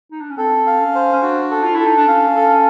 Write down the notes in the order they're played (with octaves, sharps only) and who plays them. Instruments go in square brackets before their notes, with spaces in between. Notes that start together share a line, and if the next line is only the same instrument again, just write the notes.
[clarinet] D#4
D4
C#4
[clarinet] C4 [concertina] A4
[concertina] F5
[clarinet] C#4
[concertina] C5
[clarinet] C#4
[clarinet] D4 [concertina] F#4
[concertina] A4
[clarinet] F4
[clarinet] E4 [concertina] A4
[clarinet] D#4
D4
[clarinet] C#4 [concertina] F5
[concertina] A4